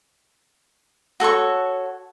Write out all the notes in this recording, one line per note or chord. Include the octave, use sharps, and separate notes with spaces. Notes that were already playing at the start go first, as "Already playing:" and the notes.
F#4 A4 C#5 C#6